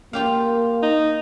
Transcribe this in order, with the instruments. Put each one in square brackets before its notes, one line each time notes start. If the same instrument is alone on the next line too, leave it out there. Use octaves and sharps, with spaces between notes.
[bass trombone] A#3 [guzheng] F4 G4 F5
[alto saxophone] D#4